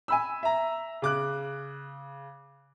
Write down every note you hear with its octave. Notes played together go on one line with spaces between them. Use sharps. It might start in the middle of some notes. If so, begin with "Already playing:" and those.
G#5 B5 E6
E5 A#5
C#3 D6 F#6